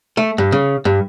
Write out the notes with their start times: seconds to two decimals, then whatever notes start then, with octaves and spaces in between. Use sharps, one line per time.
0.17 A3
0.38 G2
0.52 C#3
0.85 G2